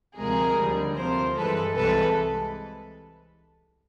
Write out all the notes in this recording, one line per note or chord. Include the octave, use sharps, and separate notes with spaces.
D2 C3 F3 G#3 G#4 A#4
D#2 D3 G3
D2 C3 F3 A#4 C5
G2 E3 G#3 A4 B4
C2 C3 E3 G#3 A4 B4